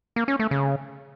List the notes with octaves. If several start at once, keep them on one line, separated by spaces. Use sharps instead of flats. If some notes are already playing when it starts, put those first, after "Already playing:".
A#3
C#4
A3
C#3